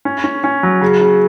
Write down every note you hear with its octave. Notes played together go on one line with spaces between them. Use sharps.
C#4
C#4
C#4
F#3
C#3
C#3